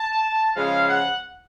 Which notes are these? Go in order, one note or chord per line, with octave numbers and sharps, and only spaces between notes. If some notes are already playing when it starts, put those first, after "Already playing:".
Already playing: A5
C#3 F3 G#3 F5
F#5